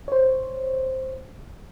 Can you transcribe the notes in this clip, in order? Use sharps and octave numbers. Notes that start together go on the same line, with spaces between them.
C5 C#5